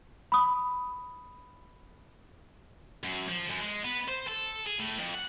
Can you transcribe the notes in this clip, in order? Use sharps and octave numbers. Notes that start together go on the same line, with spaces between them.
B5 D#6
F#2
F3
F#2
G#3
B3
C5
A4
G#4
A2
F2
F#5